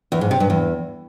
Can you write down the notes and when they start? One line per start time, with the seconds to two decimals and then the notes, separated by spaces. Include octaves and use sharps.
0.12 E2
0.21 G#2
0.31 C3
0.40 G2
0.50 E2